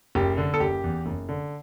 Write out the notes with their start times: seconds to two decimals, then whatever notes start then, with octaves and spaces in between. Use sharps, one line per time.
0.15 F#1 G4
0.37 D3
0.54 A4
0.60 F#1 G4
0.84 E2
1.06 F#1
1.29 D3